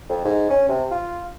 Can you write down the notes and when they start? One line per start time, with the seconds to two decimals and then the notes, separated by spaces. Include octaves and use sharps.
0.09 F2
0.25 G#2
0.50 C#4
0.69 C3
0.91 F4